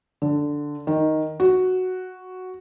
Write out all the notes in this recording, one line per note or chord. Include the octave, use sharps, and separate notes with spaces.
D3
D#3
F#4